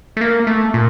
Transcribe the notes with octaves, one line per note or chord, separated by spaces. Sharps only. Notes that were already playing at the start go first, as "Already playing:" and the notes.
A3
A#3
A3
A#2